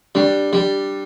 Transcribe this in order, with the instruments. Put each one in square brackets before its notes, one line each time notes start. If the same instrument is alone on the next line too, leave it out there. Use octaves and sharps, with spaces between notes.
[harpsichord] G3 [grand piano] D4
[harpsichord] G3